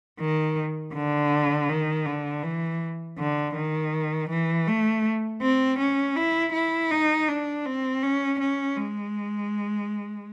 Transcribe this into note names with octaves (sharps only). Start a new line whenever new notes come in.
D#3
D3
D#3
D3
E3
D3
D#3
E3
A3
C4
C#4
E4
E4
D#4
D4
C4
C#4
C#4
G#3